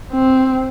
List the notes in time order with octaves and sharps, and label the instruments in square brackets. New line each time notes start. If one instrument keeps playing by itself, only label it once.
[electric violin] C4